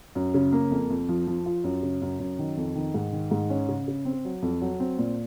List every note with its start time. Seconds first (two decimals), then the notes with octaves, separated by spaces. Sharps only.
0.15 F#2
0.34 C#3
0.53 A#3
0.71 F2
0.90 F2
1.09 F3
1.27 F3
1.46 F4
1.64 F#2
1.83 C#3
2.02 F#2
2.20 F#2
2.39 D#3
2.57 F2
2.75 D#3
2.94 G#2
3.13 D#3
3.31 G#2
3.50 C#4
3.69 C#3
3.88 C#3
4.05 C4
4.25 F#3
4.42 F2
4.61 F#3
4.80 C4
4.98 A#2